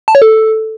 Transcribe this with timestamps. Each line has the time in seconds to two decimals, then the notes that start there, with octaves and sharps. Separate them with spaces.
0.08 A5
0.15 C#5
0.22 A4